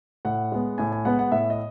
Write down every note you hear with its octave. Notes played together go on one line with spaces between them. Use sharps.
A2 F#5
G#3 B3
A2 G#5
G#5
G#3 B3 F#5
F#5
A2 E5
D#5